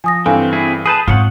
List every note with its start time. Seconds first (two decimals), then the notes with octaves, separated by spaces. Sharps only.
0.04 F3 G#5 D#6 A#6
0.26 G2 E3 C4 A4 F5 G#5
0.53 C4 E4 G#4
0.86 G#4 B4 A5 D#6 G6
1.08 G#2 C4 F4 C#5 F#5